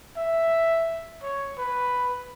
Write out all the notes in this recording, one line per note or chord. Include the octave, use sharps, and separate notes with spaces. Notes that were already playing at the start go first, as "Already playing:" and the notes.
E5
C#5
B4